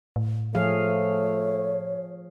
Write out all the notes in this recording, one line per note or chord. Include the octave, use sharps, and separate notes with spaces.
A2
F3 A3 G#4 C#5 F5